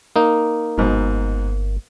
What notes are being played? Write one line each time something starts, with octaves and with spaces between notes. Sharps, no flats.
A#3 D#4
G1 G#2 B2